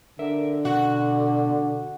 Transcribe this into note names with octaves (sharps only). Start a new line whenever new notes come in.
D3 A#4 E5
B2 F#4 F#5